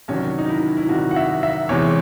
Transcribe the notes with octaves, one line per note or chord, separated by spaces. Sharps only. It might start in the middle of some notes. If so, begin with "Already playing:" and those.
C2 C3 D#3 F#3 C#4
D#4
E4
E4
C2 C3 D#3 F#3 F#4
F#5
E5
E5
E2 C3 E3 G#3 C#5